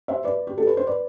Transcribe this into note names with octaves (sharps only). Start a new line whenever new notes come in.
C5 E5
B4 D5
G4
A4
B4
C5
B4 D5